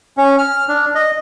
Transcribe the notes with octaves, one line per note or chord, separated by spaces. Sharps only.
C#4
F6
D4
D#5